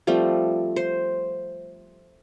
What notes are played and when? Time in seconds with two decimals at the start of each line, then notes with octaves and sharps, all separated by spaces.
0.07 F3 G3 A3 C4
0.76 C5